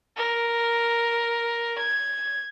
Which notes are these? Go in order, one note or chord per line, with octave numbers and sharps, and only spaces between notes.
A#4
G#6